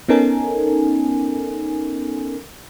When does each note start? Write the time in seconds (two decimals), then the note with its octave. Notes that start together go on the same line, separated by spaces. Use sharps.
0.08 B3 C#4 D#4 A4 A#4 G#5